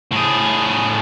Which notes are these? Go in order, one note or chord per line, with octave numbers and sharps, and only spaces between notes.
A2 G#4